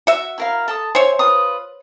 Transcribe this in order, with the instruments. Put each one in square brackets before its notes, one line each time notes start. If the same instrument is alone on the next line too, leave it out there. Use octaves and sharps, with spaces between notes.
[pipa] F#4 E5
[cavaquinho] E4 A#4 F5
A4 A5 D#6
[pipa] C5 C#5 [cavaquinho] E5 G#5
[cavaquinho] F4 B4 D#6